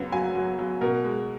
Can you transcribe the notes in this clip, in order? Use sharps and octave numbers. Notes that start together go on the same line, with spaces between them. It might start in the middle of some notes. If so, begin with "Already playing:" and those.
Already playing: F#2 C#3 B3
F#3 G#5
F#3
F#3
B2 A#4
G#3